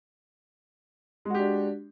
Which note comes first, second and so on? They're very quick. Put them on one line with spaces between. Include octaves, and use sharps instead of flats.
G#3 F#4 G4 D4